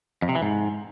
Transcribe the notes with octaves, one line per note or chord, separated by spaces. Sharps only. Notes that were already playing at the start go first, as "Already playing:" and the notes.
F2
C3
E3
G#2